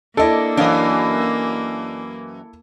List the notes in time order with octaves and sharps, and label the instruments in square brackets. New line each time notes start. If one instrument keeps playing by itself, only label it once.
[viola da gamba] A#3 [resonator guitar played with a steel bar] D4 D#5 [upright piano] E4 A4
[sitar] F#2 E3 D#5 [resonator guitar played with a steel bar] D4 C#5 F5